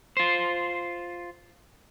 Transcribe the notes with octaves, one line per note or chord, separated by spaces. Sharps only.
F4 C5